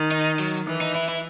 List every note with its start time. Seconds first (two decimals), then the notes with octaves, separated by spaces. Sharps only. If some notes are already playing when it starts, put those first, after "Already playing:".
Already playing: D#3
0.11 D#4
0.39 F#3
0.67 E3
0.81 D#4
0.95 E4
1.08 E4